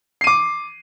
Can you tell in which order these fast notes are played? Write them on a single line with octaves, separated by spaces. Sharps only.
C7 D#7 D6